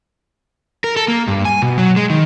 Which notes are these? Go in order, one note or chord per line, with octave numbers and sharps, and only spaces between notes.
A#4
A4
A#3
G2
G#5
B2
F#3
G#3
D#3